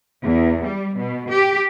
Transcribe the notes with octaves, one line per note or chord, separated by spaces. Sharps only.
E2
G3
B2
G4